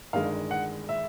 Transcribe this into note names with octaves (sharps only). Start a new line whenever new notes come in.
G1 G2 D#3 G#3 F5
F#5
E5